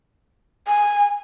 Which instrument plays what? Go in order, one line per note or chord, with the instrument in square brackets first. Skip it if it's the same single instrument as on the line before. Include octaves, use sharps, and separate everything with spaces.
[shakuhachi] G#5